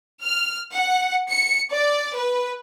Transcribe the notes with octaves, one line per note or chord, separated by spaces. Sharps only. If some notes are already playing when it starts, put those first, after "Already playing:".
F6
F#5
C#7
D5
B4